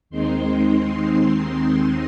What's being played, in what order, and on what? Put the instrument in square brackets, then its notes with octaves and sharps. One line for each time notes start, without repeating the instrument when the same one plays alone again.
[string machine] D#2 D#3 G#3 C4 D#4 C6